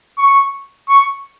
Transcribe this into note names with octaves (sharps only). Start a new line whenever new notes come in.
C#6
C#6